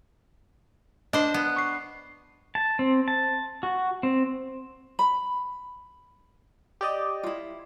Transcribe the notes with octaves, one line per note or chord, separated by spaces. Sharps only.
D4 C5 D#5
B3
C#6 C7
A5
C4
A5
F#4
C4
B5
G4 D5 D#5
E4 F4